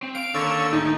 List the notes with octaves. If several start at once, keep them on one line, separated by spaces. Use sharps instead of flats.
C4
F5 D7
D#2 D3 C#4 C#5 F5 E6
D2 A2 D#4 G#4